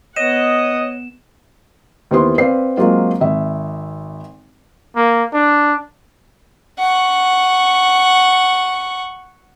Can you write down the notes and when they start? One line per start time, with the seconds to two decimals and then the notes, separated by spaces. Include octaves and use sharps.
0.16 B3 C#5 D#5 F#5 E7
2.11 D#2 E3 B3 C5 C6
2.38 C4 B4 D5 F5 C7
2.77 F#3 G#3 A#3 C4 F4
3.21 G#1 E5
4.96 A#3
5.33 D4
6.79 F#5 C#6